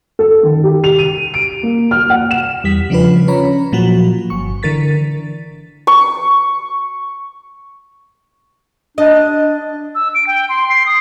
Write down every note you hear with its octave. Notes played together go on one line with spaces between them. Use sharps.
A4
D#3
G4
F7
D#7
D7
A#3
F6
F#5
E7
E2 G3 B6
C#3 F3 D4 F4 B4
C#4 C#5 A#5 B5
A#2 F3 F#3 F#4
G1 C#6
D3 E3 A#4 A6 B6
C#6
D4 D#5
E6
D7
G5
C6
C7
D#6